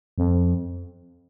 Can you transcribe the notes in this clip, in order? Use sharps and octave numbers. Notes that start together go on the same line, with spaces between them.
F2